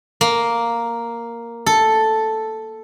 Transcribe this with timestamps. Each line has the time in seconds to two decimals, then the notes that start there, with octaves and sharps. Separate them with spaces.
0.21 A#3
1.66 A4